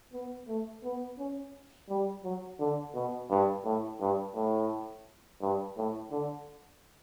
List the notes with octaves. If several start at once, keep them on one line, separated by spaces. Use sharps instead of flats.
B3
A3
B3
C#4
G3
F#3
D3
B2
G2
A2
G2
A2
G2
A2
D3